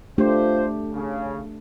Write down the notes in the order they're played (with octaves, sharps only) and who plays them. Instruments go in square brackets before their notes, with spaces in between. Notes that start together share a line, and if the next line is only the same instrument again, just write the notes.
[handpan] A3 D4 G4 [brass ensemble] F4 C5
[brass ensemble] C#3